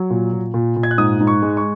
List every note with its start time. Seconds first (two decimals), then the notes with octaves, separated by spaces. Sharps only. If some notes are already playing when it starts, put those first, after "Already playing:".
Already playing: F#3
0.10 A#2
0.32 A#2
0.54 A#2
0.76 A#2
0.83 G#6
0.91 F#6
0.98 G#2 D#6
1.20 G#2
1.27 C#6
1.42 G#3
1.57 C#6